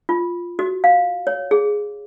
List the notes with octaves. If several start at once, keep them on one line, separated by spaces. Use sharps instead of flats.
F4
F#4
F5
C#5
G#4